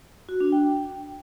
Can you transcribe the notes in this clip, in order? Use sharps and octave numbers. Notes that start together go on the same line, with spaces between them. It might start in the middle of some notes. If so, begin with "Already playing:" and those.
F#4
D4
G5